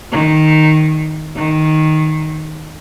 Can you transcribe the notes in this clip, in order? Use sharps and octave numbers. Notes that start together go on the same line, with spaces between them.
D#3
D#3